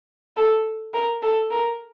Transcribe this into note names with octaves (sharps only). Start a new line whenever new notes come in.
A4
A#4
A4
A#4